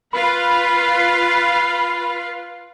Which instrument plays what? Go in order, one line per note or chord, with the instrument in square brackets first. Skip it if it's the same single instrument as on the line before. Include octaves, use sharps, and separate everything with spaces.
[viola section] F4 B4 F5 [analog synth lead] B5